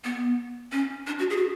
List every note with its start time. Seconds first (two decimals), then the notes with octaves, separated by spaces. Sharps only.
0.04 B3
0.72 C#4
1.07 D4
1.19 F#4
1.30 G#4
1.37 F#4